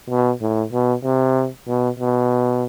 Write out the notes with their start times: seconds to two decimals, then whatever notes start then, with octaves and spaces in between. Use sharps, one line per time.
0.10 B2
0.41 A2
0.72 B2
1.04 C3
1.67 B2
1.99 B2